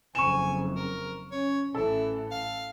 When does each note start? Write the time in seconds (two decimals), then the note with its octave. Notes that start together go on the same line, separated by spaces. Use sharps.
0.15 F#1 F2 G#5 C#6 E7
0.76 A#4
1.31 C#4 C#5
1.74 A1 E3 E4 A4
2.31 F5